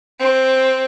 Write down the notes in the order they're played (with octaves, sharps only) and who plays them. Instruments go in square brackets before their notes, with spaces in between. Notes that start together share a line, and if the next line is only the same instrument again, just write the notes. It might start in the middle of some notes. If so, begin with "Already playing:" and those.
[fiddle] C4